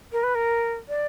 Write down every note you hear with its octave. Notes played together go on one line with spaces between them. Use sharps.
A#4
B4
A#4
D5